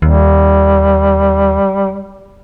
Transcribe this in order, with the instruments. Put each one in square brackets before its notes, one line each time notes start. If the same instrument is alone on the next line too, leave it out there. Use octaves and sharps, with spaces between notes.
[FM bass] D#2 [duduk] G3